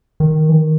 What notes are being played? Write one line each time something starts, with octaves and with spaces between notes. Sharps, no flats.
D#3
E3
D#3